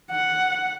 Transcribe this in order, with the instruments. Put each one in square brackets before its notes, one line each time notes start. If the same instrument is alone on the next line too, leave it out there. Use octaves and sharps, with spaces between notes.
[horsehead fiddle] F#5